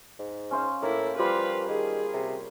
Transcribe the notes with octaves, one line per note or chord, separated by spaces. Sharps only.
G#2
C#4 C5 F5
A2 A#3 E4
F3 G3 F4 G4 B4 F5
D#3 G#4
C3